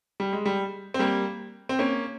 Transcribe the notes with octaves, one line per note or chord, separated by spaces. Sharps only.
G3
G#3
G3
C4
G3 A#3
C4
A#3 C#4